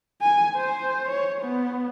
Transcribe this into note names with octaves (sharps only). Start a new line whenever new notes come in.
G#5
C5
C#5
B3